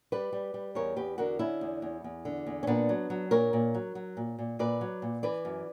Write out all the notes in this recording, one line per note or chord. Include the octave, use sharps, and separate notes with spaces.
G3 B4 D5
G3
G3
E2 A#4 C#5
E2 G4 B4
D3 F#4 A#4
D3 C#4 E4
E2
E2
E2
D3
E2
C#4
A#2 B3 D4
F#3
F#3
A#2 A#4 C#5
A#2
F#3
F#3
A#2
A#2
A#2 B4 D5
F#3
A#2
E3 B4 D5
F#2